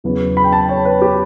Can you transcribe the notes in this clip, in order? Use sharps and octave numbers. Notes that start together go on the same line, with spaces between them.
E2 C#3 F#3 B3
B5
G5
A5
C#5
B4
G4